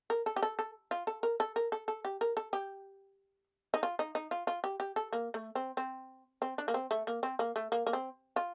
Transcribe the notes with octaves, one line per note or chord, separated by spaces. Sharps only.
A#4
A4
G4
A4
A4
F4
A4
A#4
A4
A#4
A4
A4
G4
A#4
A4
G4
D#4
F4
D#4
D#4
F4
F4
G4
G4
A4
A#3
A3
C4
C4
C4
D4
A#3
C4
A3
A#3
C4
A#3
A3
A#3
A#3
C4
F4